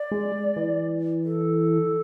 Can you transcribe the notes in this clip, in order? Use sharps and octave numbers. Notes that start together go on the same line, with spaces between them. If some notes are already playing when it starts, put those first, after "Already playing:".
Already playing: D5
G#3
E3
A4